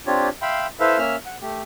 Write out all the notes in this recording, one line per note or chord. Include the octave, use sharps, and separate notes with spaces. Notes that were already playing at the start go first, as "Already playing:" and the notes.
C4 D4 F4 G4 C#5
E5 F5 G5 B5 C6
E4 A4 B4 C5 E5 F5
A#3 C#4 E5 F6
F#5
A3 G4